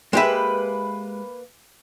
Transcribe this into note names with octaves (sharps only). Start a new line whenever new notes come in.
G#3 A#3 G4 B4 E5